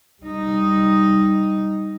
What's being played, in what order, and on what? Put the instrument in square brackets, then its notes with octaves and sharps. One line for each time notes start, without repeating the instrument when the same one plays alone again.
[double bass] G3 D#4